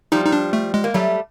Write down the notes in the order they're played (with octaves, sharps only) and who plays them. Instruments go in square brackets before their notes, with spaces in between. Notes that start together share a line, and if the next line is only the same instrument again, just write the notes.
[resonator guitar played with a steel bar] F3 G3 [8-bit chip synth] D#4
[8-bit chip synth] D#4
D4
A3
G#3
[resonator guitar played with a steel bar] A#3
[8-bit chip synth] F#3 [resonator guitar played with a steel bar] G3 A3